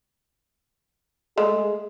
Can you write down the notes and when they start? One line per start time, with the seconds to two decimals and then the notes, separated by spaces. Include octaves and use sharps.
1.38 G#3 A3 G#4